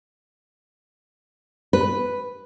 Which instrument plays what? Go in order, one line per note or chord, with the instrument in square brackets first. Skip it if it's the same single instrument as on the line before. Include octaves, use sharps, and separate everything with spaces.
[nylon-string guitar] B4